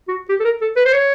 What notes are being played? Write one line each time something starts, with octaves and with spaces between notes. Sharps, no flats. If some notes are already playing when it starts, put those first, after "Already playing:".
F#4
G4
A4
A#4
A4
B4
C5
C#5